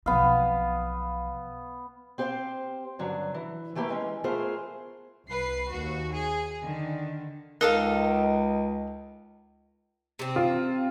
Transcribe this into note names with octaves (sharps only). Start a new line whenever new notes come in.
B1 F3 B3 F5
C4 G4 C5 F5
G2 D3 F#3 C#4
E3
E3 A3 A#3 G4 B4
E3 G#3 C#4
A3 B3 F4 G#4 A#4 C5
C2 B4 C7
D#2 F#4
G#4
D3 D#3
C#2 D#4 A4 A#4 F5
C3 C4
F4